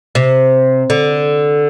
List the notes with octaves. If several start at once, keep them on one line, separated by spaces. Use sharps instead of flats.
C3
D3